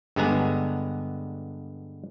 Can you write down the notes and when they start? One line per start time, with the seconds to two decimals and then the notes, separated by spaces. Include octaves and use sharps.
0.16 G2 D3 G#3 B3 G#5 A#5